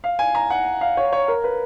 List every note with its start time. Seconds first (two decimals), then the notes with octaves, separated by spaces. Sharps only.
0.04 F5
0.19 G#5
0.35 A#5
0.50 F#5
0.81 F5
0.97 C#5
1.13 C#5
1.28 A#4
1.44 B4